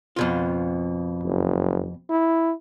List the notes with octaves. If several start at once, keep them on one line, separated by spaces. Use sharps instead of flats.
F2 B2 F4
F#1
E4